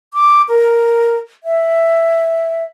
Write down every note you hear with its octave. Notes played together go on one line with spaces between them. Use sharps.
D6
A#4
E5